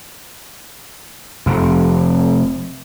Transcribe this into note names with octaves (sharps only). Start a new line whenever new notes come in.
F1 F2